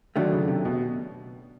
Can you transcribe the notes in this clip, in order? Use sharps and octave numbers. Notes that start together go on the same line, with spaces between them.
D3 D#3 F#3 A3 D4
C#3
C3
B2